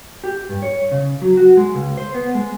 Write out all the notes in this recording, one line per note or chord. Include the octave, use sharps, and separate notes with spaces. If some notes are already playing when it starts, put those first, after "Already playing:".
G4
G2
C#5
C#3
F#3
F#4
G#3
C#2
C5
B3
G#3